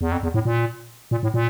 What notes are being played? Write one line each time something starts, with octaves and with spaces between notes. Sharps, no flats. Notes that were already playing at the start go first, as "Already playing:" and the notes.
E2
F2
E2
A2
A#2
A#2
A2
A#2